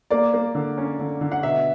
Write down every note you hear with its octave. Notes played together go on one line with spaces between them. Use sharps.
A#3 D5
A#3
D3
C#4
D3
D3
F#5
B2 E5